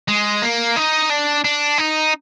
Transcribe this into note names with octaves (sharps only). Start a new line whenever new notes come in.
G#3
A#3
D#4
D4
D4
D#4